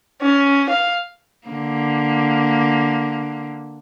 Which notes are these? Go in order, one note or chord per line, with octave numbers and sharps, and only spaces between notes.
C#4
F5
D3 A#3